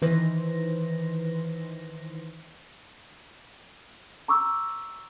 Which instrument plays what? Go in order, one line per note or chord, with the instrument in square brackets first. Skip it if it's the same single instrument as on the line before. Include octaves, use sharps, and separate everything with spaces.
[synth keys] D#3 E3 B4 C5 C6 A#6
[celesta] A#5 C#6 D6 E6